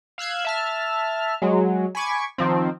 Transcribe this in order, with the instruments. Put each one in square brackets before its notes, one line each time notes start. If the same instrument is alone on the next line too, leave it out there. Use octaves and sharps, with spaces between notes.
[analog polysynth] F5 E6 F#6 G#6
E5 A5 F6
F#3 G#3
G#5 B5 C#6 D6 G#6
D#3 F3 C4